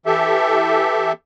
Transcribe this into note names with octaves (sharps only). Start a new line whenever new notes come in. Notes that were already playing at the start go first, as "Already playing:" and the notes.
E3 G4 A4 E5